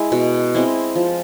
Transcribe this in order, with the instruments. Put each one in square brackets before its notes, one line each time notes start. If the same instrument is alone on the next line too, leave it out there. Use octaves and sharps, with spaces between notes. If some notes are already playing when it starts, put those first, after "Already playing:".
Already playing: [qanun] G#3 E4
B2
G#3 C4 E4
F3